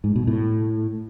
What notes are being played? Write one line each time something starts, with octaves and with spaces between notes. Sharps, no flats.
G#2
B2
A2